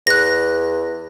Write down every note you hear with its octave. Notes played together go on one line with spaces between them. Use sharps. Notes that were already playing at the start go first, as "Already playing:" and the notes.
E2 F#6 A#6